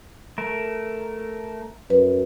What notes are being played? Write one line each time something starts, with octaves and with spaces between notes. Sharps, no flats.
A3 A#4
F#2 B4